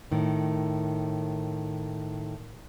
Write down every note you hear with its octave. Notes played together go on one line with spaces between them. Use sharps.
A2 D#3